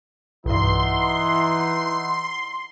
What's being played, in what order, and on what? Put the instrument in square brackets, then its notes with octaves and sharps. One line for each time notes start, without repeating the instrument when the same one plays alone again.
[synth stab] B1 G2 [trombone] E3 [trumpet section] D#4 E4 F#5 [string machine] C6